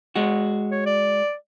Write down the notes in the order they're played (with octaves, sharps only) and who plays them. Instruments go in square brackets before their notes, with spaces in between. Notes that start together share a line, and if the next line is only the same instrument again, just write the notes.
[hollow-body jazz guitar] G#3 F#4
[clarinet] C#5
D5